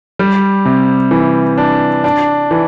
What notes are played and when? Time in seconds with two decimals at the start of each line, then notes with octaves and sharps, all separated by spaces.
0.19 G3
0.65 C3
1.11 E3
1.58 D4
2.04 D4
2.51 E3